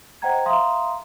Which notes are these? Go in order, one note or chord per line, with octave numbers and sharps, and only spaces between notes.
C5 D#5 F#5 G5 A#5 G#6
E5 F5 A#5 C6 D#6